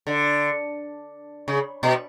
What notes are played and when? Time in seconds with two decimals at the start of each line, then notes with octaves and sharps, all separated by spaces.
0.07 D3
1.48 C#3
1.83 B2